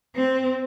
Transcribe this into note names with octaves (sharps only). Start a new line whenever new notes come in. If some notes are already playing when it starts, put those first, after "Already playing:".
C4